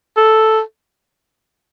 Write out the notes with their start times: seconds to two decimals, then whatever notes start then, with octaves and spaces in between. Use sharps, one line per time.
0.17 A4